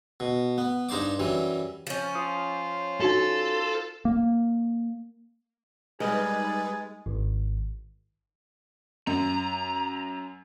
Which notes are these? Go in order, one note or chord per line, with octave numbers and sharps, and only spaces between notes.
B2
B3
G2 D#4 C5 D5 D6
F#2 E3 G3
F3 C#4
F4 C5 D#6
D#4 F#4 A4 F5
A#3
G3 G#3 D#4 G#4 A#4 B4 D#5 A6
G#1
F#2 A#5